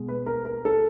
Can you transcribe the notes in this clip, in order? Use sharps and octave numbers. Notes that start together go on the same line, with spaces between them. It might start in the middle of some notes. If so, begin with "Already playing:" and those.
Already playing: B2 G#3
B4
A#4
A#4
A4